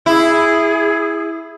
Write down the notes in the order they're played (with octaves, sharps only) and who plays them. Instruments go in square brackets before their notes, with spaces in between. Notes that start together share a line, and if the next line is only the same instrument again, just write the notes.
[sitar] E4 [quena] G#4